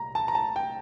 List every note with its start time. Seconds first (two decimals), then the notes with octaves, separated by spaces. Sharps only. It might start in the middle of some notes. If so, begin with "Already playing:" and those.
Already playing: C2 A#2 A#5
0.15 A5
0.28 A#5
0.35 A5
0.56 G5